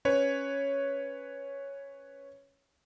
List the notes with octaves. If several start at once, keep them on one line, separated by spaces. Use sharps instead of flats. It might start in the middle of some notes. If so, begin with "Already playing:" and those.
C#4 B4 C#5